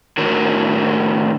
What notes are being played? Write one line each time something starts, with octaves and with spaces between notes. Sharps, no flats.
A2 D#3 D4 F#4 A#4